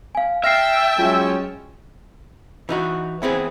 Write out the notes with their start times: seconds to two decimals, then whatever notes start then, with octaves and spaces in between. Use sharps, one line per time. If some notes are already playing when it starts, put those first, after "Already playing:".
0.15 F5 G#5
0.44 E5 G5 A5 F6 A#6 C7
0.99 F#3 G#3 C#4 F4
2.69 E3 D#4 F#4
3.22 E3 B3 C4 G#4